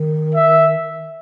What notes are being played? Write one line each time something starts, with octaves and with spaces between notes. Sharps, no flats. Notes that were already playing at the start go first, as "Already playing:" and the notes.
Already playing: D#3
E5